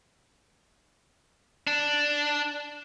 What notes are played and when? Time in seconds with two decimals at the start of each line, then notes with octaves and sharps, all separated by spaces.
1.67 D4